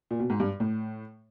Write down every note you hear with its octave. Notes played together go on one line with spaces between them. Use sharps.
A#2
B2
G#2
G2
A2